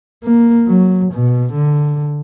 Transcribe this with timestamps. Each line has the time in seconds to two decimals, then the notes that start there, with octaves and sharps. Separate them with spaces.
0.24 A#3
0.67 F#3
1.13 B2
1.52 D3